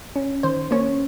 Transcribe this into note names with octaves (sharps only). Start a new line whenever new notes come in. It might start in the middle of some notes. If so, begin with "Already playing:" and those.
C#4
D#3 C5
A#3 C#4 C#5